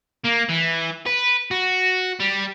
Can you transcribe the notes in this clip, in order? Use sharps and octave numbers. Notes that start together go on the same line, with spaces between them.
A#3
E3
B4
F#4
G3